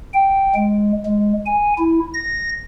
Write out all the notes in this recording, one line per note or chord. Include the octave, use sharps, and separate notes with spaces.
G5
G#3
G#3
G#5
E4
A#6